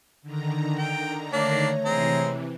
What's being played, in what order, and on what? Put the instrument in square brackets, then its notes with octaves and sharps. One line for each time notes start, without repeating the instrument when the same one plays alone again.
[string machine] D3 D#3 A#5
[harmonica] G5
[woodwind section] A3 C#5 [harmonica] A#3 D4
[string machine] C3 E3 [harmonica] G#3 C4 A#5